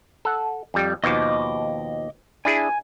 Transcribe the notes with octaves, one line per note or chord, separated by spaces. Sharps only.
A4 F#5
F2 G3
D#2 B2 F3 D#5 D6
D4 E4 G#4 G#5